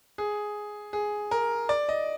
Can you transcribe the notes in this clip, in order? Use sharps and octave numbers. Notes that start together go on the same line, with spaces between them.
G#4
G#4
A#4
D5
D#5